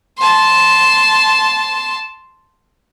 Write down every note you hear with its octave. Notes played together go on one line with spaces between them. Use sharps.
A5 C6